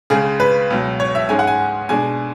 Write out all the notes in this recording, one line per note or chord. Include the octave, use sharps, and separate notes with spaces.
C#2 C#3 G#3 G#4
B4
C#2 B2 F#3
C#5
E5
G#2 G#3 C#4 G#5
F#5
G#5
B2 G#3 D4 G#5